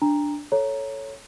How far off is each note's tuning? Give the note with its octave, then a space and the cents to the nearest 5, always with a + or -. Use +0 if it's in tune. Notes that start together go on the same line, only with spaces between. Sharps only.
D4 +0 A#5 +0
A4 +0 C#5 +0 A#5 +0